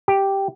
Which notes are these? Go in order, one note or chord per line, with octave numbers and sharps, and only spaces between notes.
G4